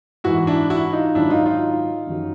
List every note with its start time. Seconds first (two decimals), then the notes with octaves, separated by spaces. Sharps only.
0.24 G#2 E3 E4 F#4
0.47 D4 E4
0.70 E4 F#4
0.93 D#4 F4
1.15 G#2 D#3 F#3 D4 E4
1.30 D#4 F4
1.45 D#4 F4
2.07 F#2 D#3 F#3